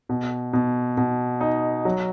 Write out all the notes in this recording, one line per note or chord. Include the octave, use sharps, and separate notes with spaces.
B2
B2
B2
D#4
F#3